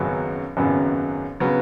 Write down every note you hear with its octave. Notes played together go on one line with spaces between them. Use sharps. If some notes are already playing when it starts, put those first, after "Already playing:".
Already playing: G#1 F#2 C#3 F#3 B3
G#1 F#2 C#3 F#3 B3
C#3 F#3 B3